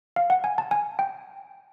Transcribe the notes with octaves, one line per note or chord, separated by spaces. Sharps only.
F5
F#5
G#5
A5
G#5
G5